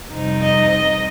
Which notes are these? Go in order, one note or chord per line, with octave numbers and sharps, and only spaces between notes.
F2 C3 G3 C4 D#4
D#5
D#5